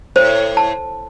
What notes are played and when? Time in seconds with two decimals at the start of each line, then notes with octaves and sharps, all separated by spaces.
0.16 A2 C5
0.57 A5